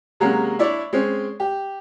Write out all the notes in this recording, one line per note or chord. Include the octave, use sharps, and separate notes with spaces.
C3 F#3 G#3 A#3 C#4 F#4
D4 E4 C#5 D5 E5
G#3 C4 C#4
G4